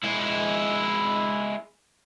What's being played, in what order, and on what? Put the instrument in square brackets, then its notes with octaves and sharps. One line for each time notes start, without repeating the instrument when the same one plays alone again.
[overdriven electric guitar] G#3 E4